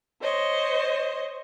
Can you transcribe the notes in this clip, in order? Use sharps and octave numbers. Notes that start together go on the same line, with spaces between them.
C5 C#5 D#5